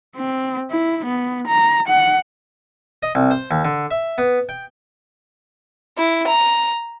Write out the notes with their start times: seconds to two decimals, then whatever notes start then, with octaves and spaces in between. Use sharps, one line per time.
0.16 C4
0.71 E4
1.05 B3
1.48 A#5
1.88 F#5
3.03 D#5
3.15 C2
3.31 C5
3.51 D#2
3.65 D3
3.91 E5
4.18 B3
4.49 G5
5.98 E4
6.28 A#5